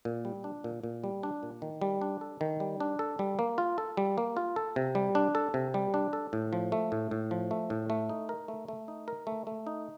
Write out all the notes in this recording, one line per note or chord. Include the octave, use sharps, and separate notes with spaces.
A#2
G3
D4
A#2
A#2
G3
D4
A#2
D#3
G3
D4
A4
D#3
G3
D4
A4
G3
A#3
F4
A4
G3
A#3
F4
A4
C3
G3
D4
A4
C3
G3
D4
A4
A2
F3
A3
A2
A2
F3
A3
A2
A3
D#4
A#4
A3
A3
D#4
A#4
A3
A3
D#4